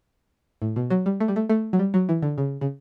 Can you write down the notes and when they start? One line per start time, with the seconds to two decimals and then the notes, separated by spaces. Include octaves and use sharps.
0.62 A2
0.76 B2
0.90 F#3
1.06 G3
1.20 A3
1.28 G3
1.36 A3
1.49 A3
1.73 F#3
1.79 G3
1.94 F#3
2.09 E3
2.22 D3
2.38 C#3
2.61 C#3